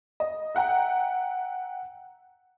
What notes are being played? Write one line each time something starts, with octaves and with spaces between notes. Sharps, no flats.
D#5
E5 F#5 G5 A#5